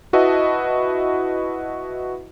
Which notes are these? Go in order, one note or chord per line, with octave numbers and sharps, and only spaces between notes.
E4 F#4 B4 D#5 E5 A5